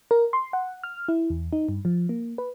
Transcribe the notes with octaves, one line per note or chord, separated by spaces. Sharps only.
A#4
C6
F#5
F6
E4
E2
D#4
G2
F3
A#3
B4